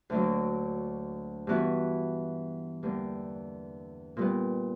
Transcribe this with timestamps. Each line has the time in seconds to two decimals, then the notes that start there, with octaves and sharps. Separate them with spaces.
0.10 D2 D3 F#3 A#3
1.47 G2 E3 B3 F#4
2.83 E2 D3 G3 A#3
4.17 A#2 G3 B3